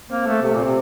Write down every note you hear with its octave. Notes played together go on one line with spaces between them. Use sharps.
A#3 C4
A3 A4
C3 A4
A#2 C4
C3